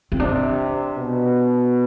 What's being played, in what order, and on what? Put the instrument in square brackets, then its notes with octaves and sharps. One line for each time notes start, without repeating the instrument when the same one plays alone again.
[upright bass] C4
[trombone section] C3 [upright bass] D4
[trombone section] B2